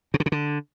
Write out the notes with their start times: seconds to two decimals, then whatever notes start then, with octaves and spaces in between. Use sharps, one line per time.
0.14 B2
0.20 D3
0.26 C#3
0.32 D3